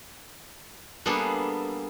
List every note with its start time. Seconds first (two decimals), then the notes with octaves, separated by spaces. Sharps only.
1.06 G3 A#3 B3 D4 G#4 A4